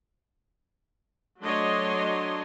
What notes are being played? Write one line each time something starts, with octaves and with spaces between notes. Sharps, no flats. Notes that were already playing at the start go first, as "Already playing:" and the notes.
F#3 A3 D4 C#5 D#5 C6